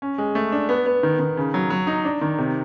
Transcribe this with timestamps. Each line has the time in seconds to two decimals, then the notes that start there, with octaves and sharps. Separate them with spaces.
0.02 C#4
0.18 G#3
0.35 A3
0.52 D4
0.69 B3
0.86 B3
1.03 D#3
1.19 D#3
1.37 C#3
1.54 F#3
1.70 F#3
1.87 D#4
2.05 D4
2.21 D#3
2.38 C3